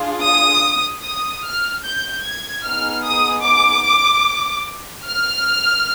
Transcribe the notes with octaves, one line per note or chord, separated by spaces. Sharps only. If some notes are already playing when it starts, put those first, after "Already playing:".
Already playing: D4 F4 G#4
D#6
D#6
F6
G6
G#6
B3 D#4 G#4 F6
D#6
D6
F6